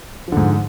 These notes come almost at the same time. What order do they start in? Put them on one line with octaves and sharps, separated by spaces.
F3 D3 G#2